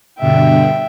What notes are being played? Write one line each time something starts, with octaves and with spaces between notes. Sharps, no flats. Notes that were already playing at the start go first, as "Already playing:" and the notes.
G2 B2 D3 E5 G5